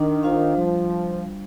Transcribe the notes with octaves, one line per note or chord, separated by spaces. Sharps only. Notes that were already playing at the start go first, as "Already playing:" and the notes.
Already playing: D#3 D4
F4 C5 F5
F3 G3